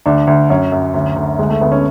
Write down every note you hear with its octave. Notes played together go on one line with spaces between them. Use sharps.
D2 D4
D2
F#2 C#4
F#2
D2
D2
D2 G#3
A3
D2 B3
C#4